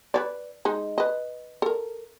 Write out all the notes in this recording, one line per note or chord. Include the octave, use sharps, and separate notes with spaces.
B4 C#5 D5
G#3 D#4
B4 D#5
A4 A#4